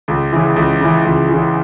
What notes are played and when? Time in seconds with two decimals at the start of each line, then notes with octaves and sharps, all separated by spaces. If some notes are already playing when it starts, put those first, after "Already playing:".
0.08 C#2
0.33 C#3 E3
0.56 C#2
0.81 C#3 E3
1.05 C#2
1.29 C#3 E3